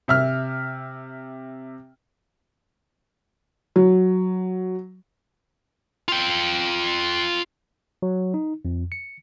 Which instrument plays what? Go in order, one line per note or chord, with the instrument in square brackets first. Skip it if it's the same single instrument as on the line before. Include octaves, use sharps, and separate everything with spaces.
[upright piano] C3 E5 F6
[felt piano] F#3
[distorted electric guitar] F4 G5
[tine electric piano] F#3
D#4
F2
C#7